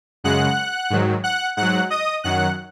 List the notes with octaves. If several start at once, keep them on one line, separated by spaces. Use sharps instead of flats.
F#2 C#3 G#3 F#5 F#6
G#2 D#3 F#3
F#5 F#6
G#2 F#3 F#5 F#6
D#5 D#6
F#2 D#3 F#3 F#5 F#6